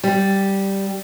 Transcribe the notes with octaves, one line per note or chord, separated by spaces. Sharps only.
G3